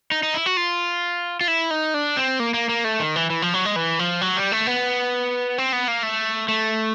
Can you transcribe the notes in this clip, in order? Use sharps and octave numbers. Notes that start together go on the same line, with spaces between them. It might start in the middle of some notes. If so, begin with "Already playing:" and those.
D#4
D#4
E4
F#4
F4
F4
E4
D#4
D4
C4
A#3
A#3
A#3
A3
D#3
E3
E3
F3
F#3
G#3
E3
F3
F#3
G3
A3
B3
C4
B3
A#3
A3
A3